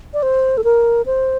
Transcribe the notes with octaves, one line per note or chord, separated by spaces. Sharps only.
D5
C5
A4
A#4
C5